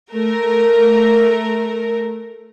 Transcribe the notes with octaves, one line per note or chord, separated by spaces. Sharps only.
A3 A#4